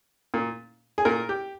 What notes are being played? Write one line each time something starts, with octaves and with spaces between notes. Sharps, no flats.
A#2
G#4
A#2 A#4
G4